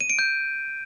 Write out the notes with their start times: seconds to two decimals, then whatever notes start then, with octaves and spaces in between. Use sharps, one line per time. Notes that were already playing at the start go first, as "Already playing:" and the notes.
0.01 D#7
0.10 D7
0.19 G6